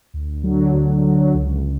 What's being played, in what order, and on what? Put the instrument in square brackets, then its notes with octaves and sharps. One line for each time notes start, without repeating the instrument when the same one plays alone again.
[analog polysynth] D2
D3 F#3
D2
D3 F#3
C#2